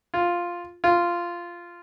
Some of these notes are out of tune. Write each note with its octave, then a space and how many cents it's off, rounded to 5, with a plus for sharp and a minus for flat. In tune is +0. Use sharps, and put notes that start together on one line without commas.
F4 +0
F4 -10